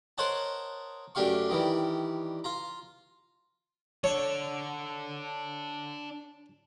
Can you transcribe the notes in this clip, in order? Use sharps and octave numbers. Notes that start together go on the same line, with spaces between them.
A#4 C5 C#5 D#5 F#5 A5
F#2 A3 D4 G4 F5 C#6
D#3 E3 G3
F4 A#5
D4 A4 C#5